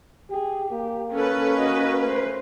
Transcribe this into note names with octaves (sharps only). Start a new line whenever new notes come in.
G4 G#4
A#3 G4
C#4 A4 B4
F#4 D#5
A3 C5